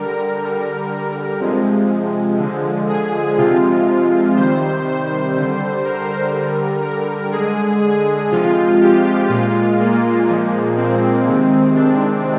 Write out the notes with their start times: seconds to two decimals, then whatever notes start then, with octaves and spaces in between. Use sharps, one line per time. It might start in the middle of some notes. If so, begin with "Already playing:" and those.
Already playing: D3 G3 A#4
0.42 D3 G3
1.40 C3 F3 G#3
2.39 D3 F3 G#3
2.89 G#4
3.38 C3 F3 G#3 F4
4.36 C3 D#3 G3 C5
4.86 C5
5.35 D3 G3
5.85 A#4
6.35 D3 G3
6.83 A#4
7.32 D3 G#3 G#4
7.81 G#4
8.32 C3 F3 G#3 F4
8.81 G4
9.29 A#2 G#3 F4
9.80 A#3
10.28 A#2 F3 G#3
10.77 C4
11.27 C3 D#3 G#3
11.76 D4